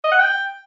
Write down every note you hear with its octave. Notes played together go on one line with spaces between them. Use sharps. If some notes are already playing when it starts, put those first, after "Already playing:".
D#5
F#5
G5